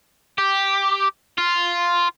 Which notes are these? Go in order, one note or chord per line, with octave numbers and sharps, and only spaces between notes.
G4
F4